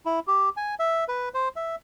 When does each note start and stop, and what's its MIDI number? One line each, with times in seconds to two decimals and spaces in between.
0.06 0.20 64
0.27 0.49 67
0.57 0.75 80
0.79 1.04 76
1.08 1.29 71
1.34 1.48 72
1.56 1.76 76